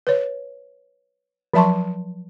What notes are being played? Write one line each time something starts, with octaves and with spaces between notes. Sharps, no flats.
B4 C#5
F3 F#3 E5 A5 C6 C#6